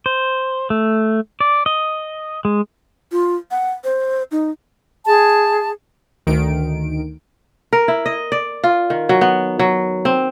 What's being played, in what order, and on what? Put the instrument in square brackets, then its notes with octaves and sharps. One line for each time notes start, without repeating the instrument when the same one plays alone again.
[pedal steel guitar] C5
A3
D5
D#5
G#3
[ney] F4
F#5
C5
D#4
[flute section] G#4 A5
[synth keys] D2 D#3 D7
[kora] A#4
E4
D#5
D5
F4
D#3
F#3
B3
F#3
C4